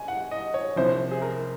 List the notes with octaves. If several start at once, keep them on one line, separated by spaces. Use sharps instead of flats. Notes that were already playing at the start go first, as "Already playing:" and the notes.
Already playing: G#2 G#5
F#5
D#5
C#5
C2 C3 F3 C5
G#4
A#4